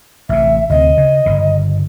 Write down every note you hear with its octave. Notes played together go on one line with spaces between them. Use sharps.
A1 C3 E5
D2 C3 C4 D#5
C#3
G1 C#3